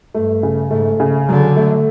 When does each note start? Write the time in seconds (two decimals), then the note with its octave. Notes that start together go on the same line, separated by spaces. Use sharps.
0.14 G2 A3
0.43 C#3
0.71 G#2 A3
1.00 C#3
1.29 D3 F#3
1.56 A3